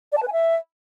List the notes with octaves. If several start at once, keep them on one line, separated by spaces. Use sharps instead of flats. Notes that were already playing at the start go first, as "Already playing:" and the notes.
D5
A5
B4
G#5
E5